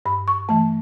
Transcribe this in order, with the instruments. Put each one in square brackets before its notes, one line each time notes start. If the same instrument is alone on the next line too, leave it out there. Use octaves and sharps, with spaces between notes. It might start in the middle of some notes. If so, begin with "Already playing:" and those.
[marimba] G2 B5
C#6
E3 A3 A5